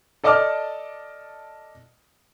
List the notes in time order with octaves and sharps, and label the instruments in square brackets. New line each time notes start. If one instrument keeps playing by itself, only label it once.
[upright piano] A4 D5 D#5 A5 D6 F6